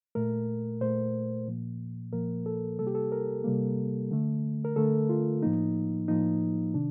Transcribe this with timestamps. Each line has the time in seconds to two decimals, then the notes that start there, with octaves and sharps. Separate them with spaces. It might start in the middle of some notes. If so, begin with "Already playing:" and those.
0.15 A#2 A3 A#4
0.81 A#2 A3 C5
1.47 A#2 F3 A#3
2.13 A#2 F3 A#3 A#4
2.46 A4
2.79 C3 G3 A#3 A4
2.87 G4
2.95 A4
3.12 A#4
3.44 C3 G3 A#3
4.11 D3 A3
4.65 A#4
4.76 D3 A3 A4
5.09 F4
5.42 A2 F3 A#3 D#4
6.08 A2 F3 A#3 D#4
6.74 C3 D#3 D4